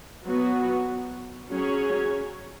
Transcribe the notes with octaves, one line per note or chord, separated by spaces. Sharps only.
F#3 B3 F#4
F#3 C#4 G#4 C#5